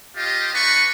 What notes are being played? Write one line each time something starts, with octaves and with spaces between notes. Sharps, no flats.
F4 G4 D#5
D4 B4 C#6